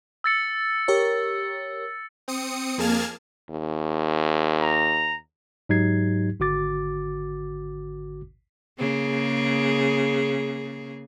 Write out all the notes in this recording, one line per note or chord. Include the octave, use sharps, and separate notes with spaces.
E6 A6 C#7
G4 A#4 C#5
C4 D#6 C#7
F2 A#3 G#4 A5 F6 G#6
D#2
A#5
G#2 F#3 D#4 G4 G#6 C7
G#1 D3 F#4 D6 A6
C#3 A#3 G#4